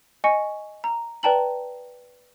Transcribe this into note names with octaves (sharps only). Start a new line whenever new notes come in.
D#5 G#5 C#6 C#7
A#5
B4 D5 G5 A5 A#5 F#7